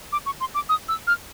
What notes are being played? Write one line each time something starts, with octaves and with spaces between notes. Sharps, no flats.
D6
C#6
C6
D6
D#6
E6
F6